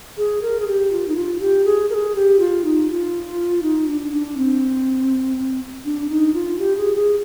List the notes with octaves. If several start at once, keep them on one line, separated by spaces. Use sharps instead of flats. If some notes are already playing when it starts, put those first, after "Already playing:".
G#4
A#4
G#4
G4
F4
D#4
F4
G4
G#4
A#4
G#4
G4
F4
D#4
F4
D#4
D4
D4
C4
D4
D#4
F4
G4
G#4
G#4